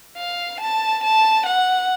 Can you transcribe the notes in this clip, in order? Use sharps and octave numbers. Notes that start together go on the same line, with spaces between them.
F5
A5
A5
F#5